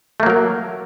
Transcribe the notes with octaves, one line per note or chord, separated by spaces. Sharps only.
F#3 A3 A#3 A#4